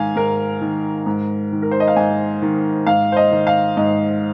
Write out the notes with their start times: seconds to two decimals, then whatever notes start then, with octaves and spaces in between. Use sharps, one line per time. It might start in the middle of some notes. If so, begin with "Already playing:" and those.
Already playing: G#2 D#3 F5 G#5
0.16 G#2 A#4
0.61 D#3
1.06 G#2
1.52 D#3
1.62 A#4
1.71 C5
1.80 D#5
1.88 F5
1.96 G#2 G#5
2.42 D#3
2.87 G#2 F5
3.12 C5
3.17 D#5
3.31 D#3
3.47 F5
3.77 G#2 D#5